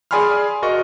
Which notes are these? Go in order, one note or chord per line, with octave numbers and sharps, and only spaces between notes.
G#4 D5 G#5 B5 C6 F6
F#4 A#4 D5 D#5 C#6